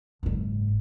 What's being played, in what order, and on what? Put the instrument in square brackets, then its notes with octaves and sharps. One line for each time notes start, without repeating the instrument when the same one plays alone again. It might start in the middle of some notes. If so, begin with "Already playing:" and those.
[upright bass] F#1 G#2